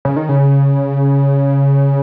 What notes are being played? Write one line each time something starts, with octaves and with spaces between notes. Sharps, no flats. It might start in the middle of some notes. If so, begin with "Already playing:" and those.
C#3
D#3
C#3